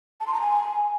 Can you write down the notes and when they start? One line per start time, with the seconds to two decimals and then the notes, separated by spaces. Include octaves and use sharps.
0.20 A5
0.27 C6
0.34 A#5
0.40 G#5